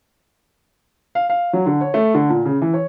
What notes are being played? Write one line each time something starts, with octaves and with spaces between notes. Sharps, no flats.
F5
F5
F#3
D3
C#5
A3
D3
A#2
C#3
E3
C#5